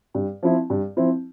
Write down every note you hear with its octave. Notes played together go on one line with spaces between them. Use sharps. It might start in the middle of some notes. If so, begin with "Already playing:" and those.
G2
F3 C4 E4
G2
F3 C4 E4